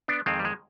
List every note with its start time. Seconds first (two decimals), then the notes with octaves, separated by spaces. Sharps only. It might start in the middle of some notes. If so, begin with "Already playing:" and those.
0.08 B3 D4
0.26 F2 D#3 G#3 C4
0.39 G3
0.45 G#3